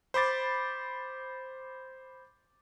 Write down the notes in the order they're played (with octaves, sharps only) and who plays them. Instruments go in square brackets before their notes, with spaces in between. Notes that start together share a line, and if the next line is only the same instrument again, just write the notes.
[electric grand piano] C5 B5 D6 A6